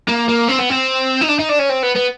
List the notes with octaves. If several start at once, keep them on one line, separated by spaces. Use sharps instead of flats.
A#3
A#3
C4
B3
C4
D#4
D4
D#4
D4
C#4
C4
B3
B3